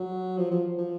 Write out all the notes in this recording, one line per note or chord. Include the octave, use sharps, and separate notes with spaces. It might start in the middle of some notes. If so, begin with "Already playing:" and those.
Already playing: F#3
F3
F3
F3